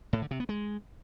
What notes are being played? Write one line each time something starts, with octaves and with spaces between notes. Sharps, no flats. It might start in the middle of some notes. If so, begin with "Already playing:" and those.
A2
D3
C3
B3
G#3